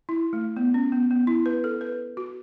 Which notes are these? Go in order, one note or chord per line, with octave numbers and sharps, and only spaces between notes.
E4
A3
B3
C#4
B3
B3
E4
B4
A4
B4
F#4